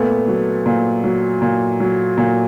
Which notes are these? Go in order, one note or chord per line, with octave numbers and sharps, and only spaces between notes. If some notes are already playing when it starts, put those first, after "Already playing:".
Already playing: A#2 A3 B3
F#3
A#2
F#3
A#2
F#3
A#2